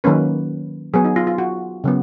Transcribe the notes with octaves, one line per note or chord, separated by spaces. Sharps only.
D#3 F#3 A#3 C#4 B4
F#3 B3 G#4
D#4
F4
F4
F#4
C#3 F#3 B3